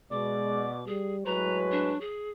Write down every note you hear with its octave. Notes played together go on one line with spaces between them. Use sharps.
B2 G#3 D5 D6
G3 G#4
A2 F#3 G#3 B4 C#5 A#5
D4
G#4